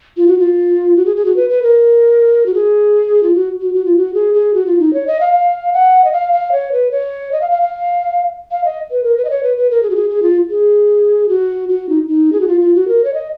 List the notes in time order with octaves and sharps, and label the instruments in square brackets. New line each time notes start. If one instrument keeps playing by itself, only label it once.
[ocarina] F4
F#4
F4
F#4
G#4
G#4
F#4
B4
B4
A#4
F#4
G#4
F4
F#4
F#4
F#4
F4
F#4
G#4
G#4
F#4
F4
D#4
C#5
D#5
F5
F5
F#5
D#5
F5
F5
C#5
B4
C#5
D#5
F5
F5
F5
F5
D#5
B4
A#4
B4
D#5
C#5
B4
B4
A#4
G#4
F#4
G#4
G#4
F4
G#4
F#4
F#4
D#4
D#4
G#4
F#4
F4
F4
F#4
A#4
C#5
D#5